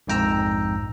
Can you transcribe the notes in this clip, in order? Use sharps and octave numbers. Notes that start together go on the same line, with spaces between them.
A#1 F2 G#2 G5 A#5 E6